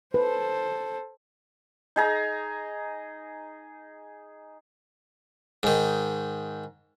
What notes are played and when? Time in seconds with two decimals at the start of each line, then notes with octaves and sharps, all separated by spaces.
0.14 A4 B4 C5
1.96 D#4 G#4 A#5
5.63 G#2 D#3